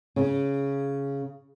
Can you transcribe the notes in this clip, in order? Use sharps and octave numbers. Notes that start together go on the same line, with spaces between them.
C#3